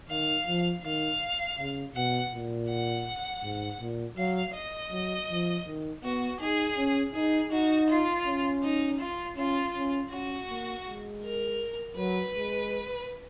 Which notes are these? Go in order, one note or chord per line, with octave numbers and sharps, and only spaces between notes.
D#3 F5
F3
D#3 F5
C#3
B2 F#5
A#2
F#5
G#2
A#2
F#3 F5
D#5
F#3
F3
D#3
B3 F#4
D#4 G#4
C#4
D#4 G#4
D#4 F#4
F4
C#4
D#4
F4
C#4 F4
C#4
C#4 F#4
A#3
G#3
A#4
F#3 B4
G#3